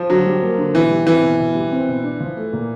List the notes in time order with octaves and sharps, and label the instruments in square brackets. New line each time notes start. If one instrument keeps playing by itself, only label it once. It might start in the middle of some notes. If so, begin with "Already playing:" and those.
Already playing: [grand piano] F3
[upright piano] D3 [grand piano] F#3
[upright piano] G3
A#3
D3
[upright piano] B2 [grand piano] E3
[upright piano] G3
[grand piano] E3 [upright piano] C4
[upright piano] B2
B2
G3
C4
B2
D4
F3
A3
A#2